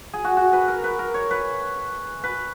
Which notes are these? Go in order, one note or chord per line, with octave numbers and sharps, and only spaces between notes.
G#4
F#4
F#4
B4
A#4
B4
A#4
C#5
B4
B4